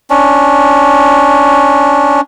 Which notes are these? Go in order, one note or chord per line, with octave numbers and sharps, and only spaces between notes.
C#4 D4